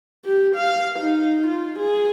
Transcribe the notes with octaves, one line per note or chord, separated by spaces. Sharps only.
G4
F5
D#4
F4
G#4